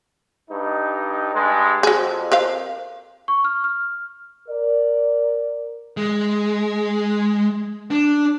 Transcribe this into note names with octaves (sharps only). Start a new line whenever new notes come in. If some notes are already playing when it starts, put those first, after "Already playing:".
G2 D#4
G2 G#3
F2 F#4 G#4
A#4 C5 F5
C#6
F6
F6
A#4 D5
G#3
D4